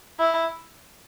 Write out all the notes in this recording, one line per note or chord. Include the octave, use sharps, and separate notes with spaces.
E4